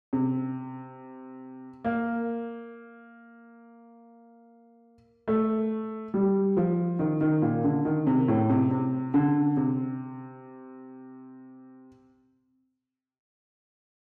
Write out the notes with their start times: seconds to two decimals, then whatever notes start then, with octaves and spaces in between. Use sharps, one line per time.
0.13 C3
1.84 A#3
5.28 A3
6.14 G3
6.57 F3
6.99 D#3
7.21 D#3
7.42 A#2
7.64 D3
7.85 D#3
8.07 C3
8.28 A2
8.50 C3
8.71 C3
9.14 D3
9.57 C3